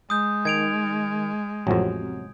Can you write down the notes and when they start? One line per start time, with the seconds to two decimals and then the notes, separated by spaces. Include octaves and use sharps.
0.10 G#3 D#6 G6
0.45 D#3 G#6 D7 F7
1.67 A1 F2 C3 F#3